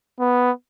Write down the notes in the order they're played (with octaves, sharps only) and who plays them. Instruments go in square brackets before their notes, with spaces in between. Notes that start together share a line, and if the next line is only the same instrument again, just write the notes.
[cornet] B3